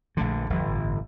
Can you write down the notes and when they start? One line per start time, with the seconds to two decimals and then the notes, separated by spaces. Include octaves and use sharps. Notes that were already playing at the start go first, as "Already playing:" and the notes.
0.17 A#1 D3 F3 A3
0.50 G1 E2 F3
0.63 A1